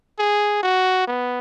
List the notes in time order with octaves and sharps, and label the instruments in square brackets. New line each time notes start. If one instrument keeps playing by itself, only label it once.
[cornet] G#4
F#4
B3